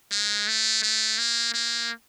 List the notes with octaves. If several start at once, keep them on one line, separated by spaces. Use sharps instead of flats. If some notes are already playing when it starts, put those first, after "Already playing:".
G#3
A3
A3
A#3
A#3